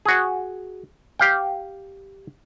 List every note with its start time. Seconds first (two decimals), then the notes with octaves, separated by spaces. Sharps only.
0.05 F#4 G#4
1.19 G4 F5 G5